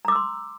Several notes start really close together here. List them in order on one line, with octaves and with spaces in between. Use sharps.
A#5 D6 E6 C6